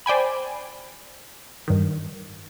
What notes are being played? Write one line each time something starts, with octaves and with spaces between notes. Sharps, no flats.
C5 D5 G5 G#5 B5
G2 D#3